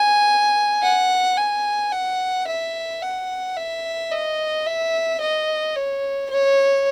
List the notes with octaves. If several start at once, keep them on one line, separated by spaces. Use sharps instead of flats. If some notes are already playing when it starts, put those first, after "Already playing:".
Already playing: G#5
F#5
G#5
F#5
E5
F#5
E5
D#5
E5
D#5
C#5
C#5